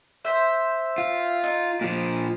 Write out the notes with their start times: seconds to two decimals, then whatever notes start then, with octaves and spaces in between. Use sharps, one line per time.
0.25 C5 E5
0.98 F4
1.44 D#4
1.81 A#2 F3